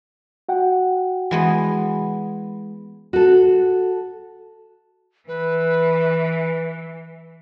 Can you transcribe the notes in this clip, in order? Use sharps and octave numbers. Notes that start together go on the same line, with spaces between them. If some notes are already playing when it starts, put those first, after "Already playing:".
F#4 F#5 G5
E3 G#3 B3
F#4 A4
E3 B4